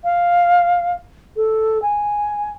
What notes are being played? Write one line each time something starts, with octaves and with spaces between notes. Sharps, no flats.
F5
A4
G#5